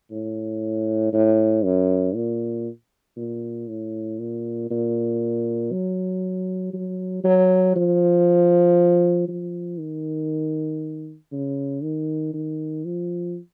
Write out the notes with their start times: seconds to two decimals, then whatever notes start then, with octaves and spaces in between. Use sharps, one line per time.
0.11 A2
1.13 A2
1.64 F#2
2.15 A#2
3.16 A#2
3.68 A2
4.19 A#2
4.70 A#2
5.72 F#3
6.73 F#3
7.24 F#3
7.75 F3
9.28 F3
9.79 D#3
11.32 C#3
11.82 D#3
12.33 D#3
12.85 F3